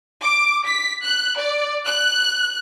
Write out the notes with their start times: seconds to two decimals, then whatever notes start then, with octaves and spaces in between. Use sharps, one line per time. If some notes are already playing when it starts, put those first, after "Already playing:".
0.22 D6
0.66 B6
1.04 F#6
1.36 D5
1.85 F#6